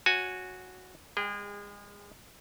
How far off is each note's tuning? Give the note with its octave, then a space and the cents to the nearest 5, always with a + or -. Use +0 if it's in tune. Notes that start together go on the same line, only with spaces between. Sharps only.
F#4 -10 C#5 +10 G#5 +0
G#3 -35 G#4 -25 G5 +0